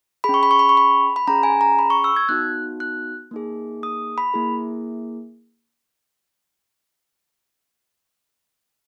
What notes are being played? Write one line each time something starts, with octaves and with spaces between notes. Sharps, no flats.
C#4 G#4 B5
C#6
B5
C#6
B5
C#6
B5
B5
C#4 G#4 A#5
G#5
A#5
B5
C#6
E6
G#6
B3 D#4 F#4 F#6
F#6
A#3 D#4 G#4
D#6
B5
A#3 E4 G#4